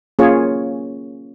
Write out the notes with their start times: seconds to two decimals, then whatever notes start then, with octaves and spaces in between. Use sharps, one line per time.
0.19 A#3 C#4 F4 G#4 C#5